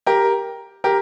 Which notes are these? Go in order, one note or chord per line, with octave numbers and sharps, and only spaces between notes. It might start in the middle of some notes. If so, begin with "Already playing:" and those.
G4 A#4
G4 A#4